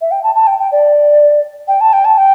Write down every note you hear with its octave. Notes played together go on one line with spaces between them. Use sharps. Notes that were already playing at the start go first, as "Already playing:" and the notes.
E5
G5
A5
A5
G5
G5
D5
G5
A5
G5
A5
G5